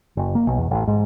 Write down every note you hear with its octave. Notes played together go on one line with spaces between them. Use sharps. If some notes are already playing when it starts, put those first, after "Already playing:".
F#1
A#3
B1
E2
A1
G#2